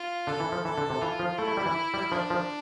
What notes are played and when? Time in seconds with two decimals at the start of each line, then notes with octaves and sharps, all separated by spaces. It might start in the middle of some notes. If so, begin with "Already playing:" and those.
Already playing: F4
0.27 D3 A4
0.40 E3
0.52 F3
0.65 E3 A4
0.78 D3
0.90 C3
1.01 E3 F4
1.19 F3
1.38 A3 E4
1.48 A3
1.57 G3
1.66 E3
1.94 G3
2.12 F3 D4
2.30 F3